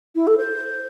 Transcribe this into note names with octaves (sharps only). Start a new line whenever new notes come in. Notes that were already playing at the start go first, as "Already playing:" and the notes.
E4
A4
C5